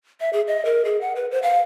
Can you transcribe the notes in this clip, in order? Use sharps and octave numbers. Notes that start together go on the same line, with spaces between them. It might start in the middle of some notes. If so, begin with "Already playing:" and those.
E5
G#4
D#5
A#4
G#4
F#5
B4
C5
F5